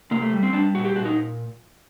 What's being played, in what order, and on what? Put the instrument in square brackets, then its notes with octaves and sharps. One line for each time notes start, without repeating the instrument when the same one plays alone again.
[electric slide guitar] C3 A#3
A3
G3
C4
G3 D4
A#2 F#4
G4
A#2 F#4
D#4